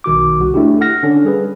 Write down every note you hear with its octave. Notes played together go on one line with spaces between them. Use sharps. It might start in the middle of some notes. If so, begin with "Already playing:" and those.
B1 D#3 F#4 D6
C2 F#4
A3 D4 E4 G4
F#5 F6 A#6
D3 C#4 D4 A4
G3 G#4 B4